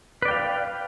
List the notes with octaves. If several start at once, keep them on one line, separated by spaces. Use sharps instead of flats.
B4 D5 F5 G5